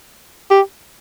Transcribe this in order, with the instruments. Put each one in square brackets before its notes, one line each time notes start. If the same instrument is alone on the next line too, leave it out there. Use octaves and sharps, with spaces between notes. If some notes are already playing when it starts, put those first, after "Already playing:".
[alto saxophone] G4